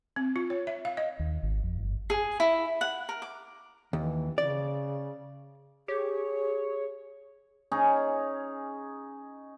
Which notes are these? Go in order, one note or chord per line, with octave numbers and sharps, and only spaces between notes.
C4
F4
C#5
E5
F5
D#5
D#2
G#1
F2
G1
G#4
E4
F#5
A#4
D6
D#2 E3
C#3 D5
G4 G#4 C#5
C#4 D#4 G#4